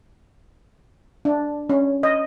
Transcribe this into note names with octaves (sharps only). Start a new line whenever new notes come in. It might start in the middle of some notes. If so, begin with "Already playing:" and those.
D4
C#4
D#5